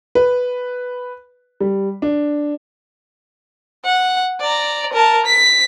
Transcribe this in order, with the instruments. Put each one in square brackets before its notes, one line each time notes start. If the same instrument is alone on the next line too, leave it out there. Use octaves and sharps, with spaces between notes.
[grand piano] B4
G3
D4
[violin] F#5
D5 A#5
A#4 A5
B6